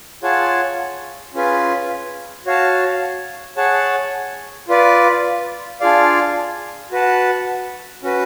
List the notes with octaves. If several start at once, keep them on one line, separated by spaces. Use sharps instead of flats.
F4 G#4 C#5 F#5 A5
C#4 F4 G#4 B4
F#4 C#5 F5 A5
G#4 C#5 F#5 A5
F4 B4 D5
D4 F4 G#4 D5 F5
F#4 B4 F#5 A5
C#4 F#4 B4